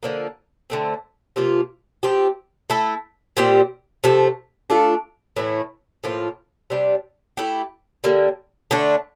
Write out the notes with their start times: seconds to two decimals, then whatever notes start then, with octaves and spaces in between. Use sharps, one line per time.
0.03 D3 F3 A#3
0.70 D3 A3 C4
1.36 C3 F3 A#3 F4
2.03 F3 C4 G4
2.70 A3 E4 A4
3.37 A#2 G3 C4 G4
4.04 C3 F3 A3
4.70 A3 D4 F4 A4
5.36 A2 E3 A3 E4
6.04 A2 F3 A#3 F4
6.70 C3 G3 D4
7.37 A3 E4 G4
8.04 D3 G3 A#3
8.71 D3 A3 D4